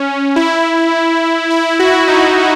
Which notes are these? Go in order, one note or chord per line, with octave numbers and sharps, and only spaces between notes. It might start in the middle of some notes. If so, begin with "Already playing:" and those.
Already playing: C#4
E4
E4
F#4
D#4
E4